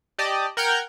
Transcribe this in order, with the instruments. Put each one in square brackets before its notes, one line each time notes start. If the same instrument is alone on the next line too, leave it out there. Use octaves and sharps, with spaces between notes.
[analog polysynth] G4 D5 D#5 A5
A#4 F#5 G5 F6 G6 G#6